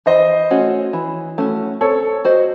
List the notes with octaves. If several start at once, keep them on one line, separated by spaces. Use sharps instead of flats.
E3 C5 D#5
A3 C#4 F#4
E3
A3 C#4 F#4
C4 A4 C#5
F#4 C5 D#5